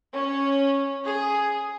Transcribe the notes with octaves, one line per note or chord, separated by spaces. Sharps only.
C#4
G#4